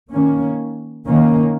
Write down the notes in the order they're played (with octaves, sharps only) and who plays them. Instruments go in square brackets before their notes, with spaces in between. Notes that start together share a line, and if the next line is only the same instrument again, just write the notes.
[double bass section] D#3 A#3 C#4
D#3 A#3 C#4